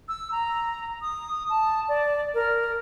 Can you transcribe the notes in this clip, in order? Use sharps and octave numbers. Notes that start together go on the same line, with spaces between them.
E6
A#5
D#6
A5
D5
A#4